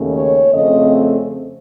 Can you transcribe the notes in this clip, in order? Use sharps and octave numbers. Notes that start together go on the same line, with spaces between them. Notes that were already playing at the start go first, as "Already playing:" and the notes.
Already playing: D#2 C#3 A3 C#4
C#5
F2 C#3 A3 C4 D#5